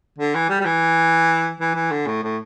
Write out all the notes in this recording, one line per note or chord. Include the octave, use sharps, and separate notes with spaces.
D3
E3
G3
G3
E3
E3
E3
D3
A2
A2